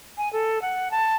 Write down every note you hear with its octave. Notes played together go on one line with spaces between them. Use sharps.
G#5
A4
F#5
A5